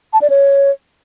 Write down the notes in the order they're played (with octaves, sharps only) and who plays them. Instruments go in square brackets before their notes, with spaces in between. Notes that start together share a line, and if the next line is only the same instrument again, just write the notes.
[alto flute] A5
D5
C#5